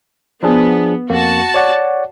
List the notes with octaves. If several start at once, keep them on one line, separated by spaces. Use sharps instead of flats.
F3 B3 D4 G#4
F2 A#3 F#4 A5
C#5 D5 F#5